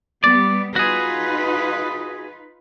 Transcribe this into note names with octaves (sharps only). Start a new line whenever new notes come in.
G3 B3 D5
D#4 F4 F#4 G#4 B4